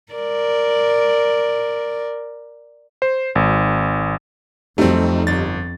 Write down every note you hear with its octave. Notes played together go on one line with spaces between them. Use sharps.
A#4 D5
C5
G#1
F2 F#3 G3 A3 C4 D#4
G1 A6